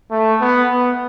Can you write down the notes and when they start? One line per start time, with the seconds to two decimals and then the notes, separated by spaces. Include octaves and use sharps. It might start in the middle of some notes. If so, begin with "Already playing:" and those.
0.11 A3
0.41 B3
0.71 B3